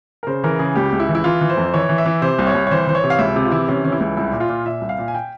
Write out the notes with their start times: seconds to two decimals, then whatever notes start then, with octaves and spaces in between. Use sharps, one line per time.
0.23 A#4
0.27 C#3 C5
0.44 E3 A#4
0.59 C#3 G#4
0.76 C#2 G4
0.92 C#2
1.00 E4
1.09 E3
1.15 E4
1.24 E3 F4
1.41 E3
1.50 C5
1.57 F2
1.74 E3 C#5
1.89 E3
1.98 E5
2.06 E3
2.22 C3 C5
2.39 C2
2.47 C#5
2.55 C2
2.67 C#5
2.71 E3 C5
2.87 E3 C5
2.95 C#5
3.04 C3
3.10 F5
3.19 C#2 E5
3.36 C3
3.45 F4
3.52 E3 E4
3.69 C3 C#4
3.84 E3 C#4
3.92 E4
4.00 C#2
4.17 C2 E4
4.32 A#2
4.40 F4
4.49 A#2
4.66 A#2 E5
4.81 C2
4.89 F5
4.98 A#2
5.08 G#5
5.15 G5